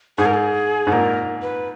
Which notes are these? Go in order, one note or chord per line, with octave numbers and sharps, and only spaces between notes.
G#2 G#4
A#4
G#4
G#2
A#2 A#4
B4